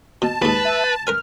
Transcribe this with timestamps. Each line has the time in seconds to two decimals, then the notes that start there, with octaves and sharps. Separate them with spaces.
0.22 B2 A5
0.42 D#2 G#2 B4
0.65 E5
0.84 A6
1.07 A#4 B4 G#5 F6